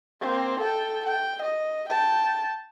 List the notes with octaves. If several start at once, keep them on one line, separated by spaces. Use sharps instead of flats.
A#3 C4
A4 G5
G5
D#5
G5 A5